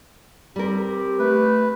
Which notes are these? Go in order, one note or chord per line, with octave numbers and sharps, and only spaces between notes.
G3 C4 G4 A#4
A3 B4